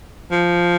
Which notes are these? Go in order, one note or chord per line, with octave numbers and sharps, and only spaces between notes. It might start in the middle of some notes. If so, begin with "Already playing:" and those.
F3